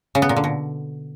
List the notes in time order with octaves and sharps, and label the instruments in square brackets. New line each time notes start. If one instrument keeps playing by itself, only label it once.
[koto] C#3
B3
A#2
D3
B2